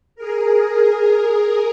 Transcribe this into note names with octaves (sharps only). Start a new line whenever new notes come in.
G#4 A#4